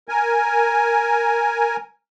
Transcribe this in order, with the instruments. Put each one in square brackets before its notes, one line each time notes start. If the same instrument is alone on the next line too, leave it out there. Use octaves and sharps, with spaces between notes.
[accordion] A#4 G#5